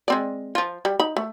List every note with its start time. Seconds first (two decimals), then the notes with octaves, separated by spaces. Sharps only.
0.08 G#3 C4 D5
0.55 F3 F4
0.85 G3
0.99 D#4 B5
1.17 A3